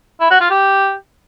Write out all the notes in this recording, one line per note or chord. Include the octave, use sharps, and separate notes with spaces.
E4
F#4
F4
G4